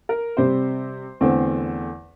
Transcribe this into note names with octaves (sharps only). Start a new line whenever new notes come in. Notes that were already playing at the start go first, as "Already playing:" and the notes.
A#4
C3 G3 C4 C5
E2 D3 A3 C4